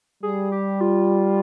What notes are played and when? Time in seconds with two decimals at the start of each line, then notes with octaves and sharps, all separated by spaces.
0.23 G3 G#4
0.52 G4
0.81 F4